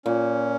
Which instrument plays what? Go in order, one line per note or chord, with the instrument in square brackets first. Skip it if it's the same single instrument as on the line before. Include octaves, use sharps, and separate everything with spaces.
[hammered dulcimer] A#2 [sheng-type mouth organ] C#4